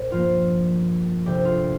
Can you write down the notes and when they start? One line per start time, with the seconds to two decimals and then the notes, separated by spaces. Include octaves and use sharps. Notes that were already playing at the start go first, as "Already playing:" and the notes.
Already playing: A#2 A#4 C5
0.10 G2 F3 A#3 F4
1.26 D2 C3 G3 G4
1.45 F4